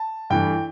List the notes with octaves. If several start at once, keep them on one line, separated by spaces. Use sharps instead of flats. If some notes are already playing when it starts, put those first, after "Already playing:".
Already playing: A5
G2 E3 A3 G5